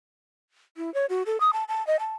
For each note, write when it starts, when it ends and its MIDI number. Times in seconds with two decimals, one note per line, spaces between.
0.77 0.93 64
0.94 1.06 73
1.09 1.23 66
1.26 1.40 69
1.40 1.51 87
1.53 1.64 81
1.68 1.85 81
1.87 1.96 75
2.00 2.16 81